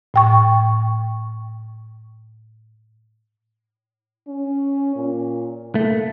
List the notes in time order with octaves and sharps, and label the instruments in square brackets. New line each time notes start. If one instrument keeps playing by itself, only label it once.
[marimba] A2 G5 C#6
[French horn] C#4
A#2
[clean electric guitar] A3 [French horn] A#3